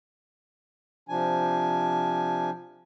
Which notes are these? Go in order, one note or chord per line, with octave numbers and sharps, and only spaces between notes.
C3 F3 D4 G#5